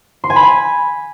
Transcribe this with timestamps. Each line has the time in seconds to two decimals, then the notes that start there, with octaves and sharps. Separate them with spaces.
0.24 C6
0.30 G#5
0.36 B5
0.42 G#5